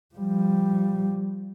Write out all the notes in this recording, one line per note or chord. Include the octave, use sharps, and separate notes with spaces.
F3 G3